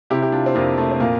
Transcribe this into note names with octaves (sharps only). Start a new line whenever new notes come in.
C3 E4 G4
G4
D4 F4
C4
F2 A#3 D4
A3
C4
A#2 A#3